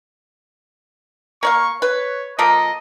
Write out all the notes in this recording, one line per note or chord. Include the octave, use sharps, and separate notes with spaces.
A#3 D5 F5 C#6
B4 C#5
F3 A#3 A4 D#5